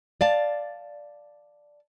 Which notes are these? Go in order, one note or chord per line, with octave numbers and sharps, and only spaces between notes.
D5 F5 A5